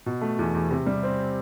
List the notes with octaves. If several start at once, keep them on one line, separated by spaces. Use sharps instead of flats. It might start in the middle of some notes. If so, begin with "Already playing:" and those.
B2
A3
E2
E2
C3
G3
C4